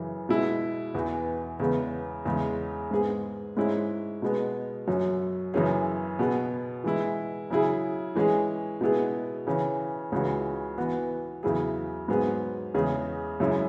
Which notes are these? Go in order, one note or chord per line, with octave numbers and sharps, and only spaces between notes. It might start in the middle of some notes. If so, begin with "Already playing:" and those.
Already playing: F#2 C#3 E3
B2 G#3 E4
E2 E3 B3
E2 C#3 G#3 B3
E2 C#3 G#3
G#2 G#3 B3 G#4
G#2 G#3 C#4 E4
B2 G#3 B3
F#2 F#3 C#4
F#2 C#3 E3 C#4 G#4
B2 B3 G#4
E3 G#3 E4
C#3 F#3 E4 G#4
E3 G#3 C#4 G#4
B2 G#3 B3 E4 G#4
C#3 E3 C#4
C#2 C#3 E3 C#4 F#4
E3 B3 F#4
E2 C#3 F#3 E4 G#4
G#2 F#3 B3 G#4
E2 C#3 G#3 C#4 G#4
F#2 C#3 G#3 C#4 E4